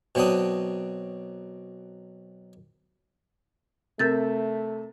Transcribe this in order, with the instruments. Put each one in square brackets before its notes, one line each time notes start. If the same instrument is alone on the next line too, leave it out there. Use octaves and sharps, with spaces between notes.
[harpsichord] B2 F#3 C4 D4 D#6
[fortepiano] C3 E5 [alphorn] A3 [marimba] A#4 G6 A6